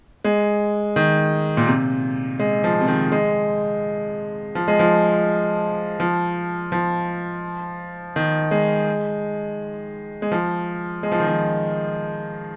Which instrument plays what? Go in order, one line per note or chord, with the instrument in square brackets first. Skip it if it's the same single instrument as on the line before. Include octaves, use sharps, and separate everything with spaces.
[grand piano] G#3
D#3
A#2
C3
G#3
F3
C3
D#3
G#3
F3
G#3
F3
F3
F3
D#3
G#3
G#3
F3
G#3
F3
D#3
F3